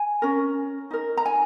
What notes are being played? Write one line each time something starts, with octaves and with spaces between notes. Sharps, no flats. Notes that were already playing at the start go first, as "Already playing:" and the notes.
Already playing: G#5
C#4 A#4
D#4 A#4
A#5
G#5